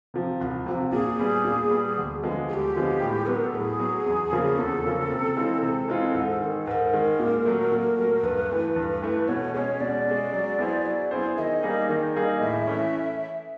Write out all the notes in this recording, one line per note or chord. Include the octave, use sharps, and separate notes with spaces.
C3 F3
C2
C3 F3
A#2 G#4
G3 B3
A#2
G3 B3
D2
D3 F3 G#3 B3
D2 G4 G#4
D3 F3 G#3 B3
A2
F#3 B3 B4
A#4
A4
A2 G#4
F#3 B3
E2
C#3 F3 A#3 C#4
E2 A4
C#3 F3 A#3 C#4
C3
E3 G#3 C4 F4
C3 A4
E3 G#3 C4 F4
G#2
D#3 G#3
G#2 A#4 B4
D#3 G#3
A#2
F#3 A3
A#2
F#3 A3
G2 B4
E3 A3
G2
E3 A3
B2 C#5
G#3 C#4 C#5
B2 D5
G#3 C#4
F#3
B3 E4 G#4 C5
F#3
B3 E4 G#4 C5
D#3 D#5 E5
G3 A#3 D#4 G#4
D#3
G3 A#3 D#4 G#4
A2 E5
E3 A3 C#4